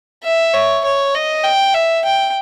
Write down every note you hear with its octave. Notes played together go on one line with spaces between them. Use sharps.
E5
C#5
C#5
D#5
G5
E5
G5